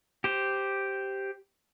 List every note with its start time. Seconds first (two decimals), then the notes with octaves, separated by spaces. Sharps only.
0.24 G4 C5